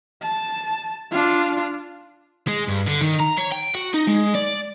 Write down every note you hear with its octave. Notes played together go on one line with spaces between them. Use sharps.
A5
D4 F4
G#3
G2
D3
D#3
A#5
C#5
G5
F#4
D#4
G#3
D5